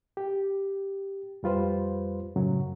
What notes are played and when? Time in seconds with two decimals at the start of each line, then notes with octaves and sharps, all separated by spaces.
0.17 G4
1.43 F2 G3 F4 B4 C5
2.36 F#2 A2 C#3 F#3